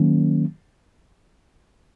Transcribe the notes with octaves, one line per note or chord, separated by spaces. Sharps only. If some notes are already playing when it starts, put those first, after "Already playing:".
Already playing: D#3 F#3 A#3 C#4